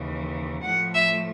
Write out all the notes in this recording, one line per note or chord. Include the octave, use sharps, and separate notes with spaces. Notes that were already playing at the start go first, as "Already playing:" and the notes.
Already playing: D#2 C#3 E3
A2 F3 A3 F#5
E5